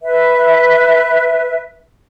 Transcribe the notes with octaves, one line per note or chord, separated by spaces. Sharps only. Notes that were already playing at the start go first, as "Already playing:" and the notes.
B4 E5